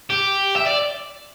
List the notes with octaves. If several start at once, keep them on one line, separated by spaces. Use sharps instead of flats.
G4
E5
D5